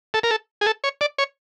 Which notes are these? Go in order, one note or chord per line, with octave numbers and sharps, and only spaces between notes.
A4
A#4
A4
G#4
A4
C#5
D5
C#5